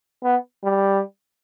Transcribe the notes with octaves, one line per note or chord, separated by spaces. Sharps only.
B3
G3